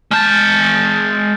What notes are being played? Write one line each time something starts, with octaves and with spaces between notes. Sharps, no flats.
G#3 A5 F6 G6 A6